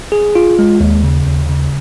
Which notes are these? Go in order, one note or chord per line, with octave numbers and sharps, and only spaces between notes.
G#4
F4
G#3
D#2
C#3
D#2
C#3